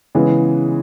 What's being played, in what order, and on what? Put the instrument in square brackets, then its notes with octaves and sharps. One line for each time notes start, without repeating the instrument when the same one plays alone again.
[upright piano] C#3 E3 G#3 B3 E4